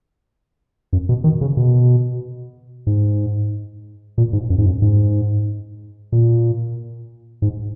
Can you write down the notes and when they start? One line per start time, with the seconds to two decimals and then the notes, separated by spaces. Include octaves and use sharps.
0.93 F#2
1.09 B2
1.24 D#3
1.41 C#3
1.57 B2
2.87 G#2
4.18 A#2
4.33 G#2
4.50 F#2
4.58 G#2
4.66 F#2
4.82 G#2
6.12 A#2
7.42 G#2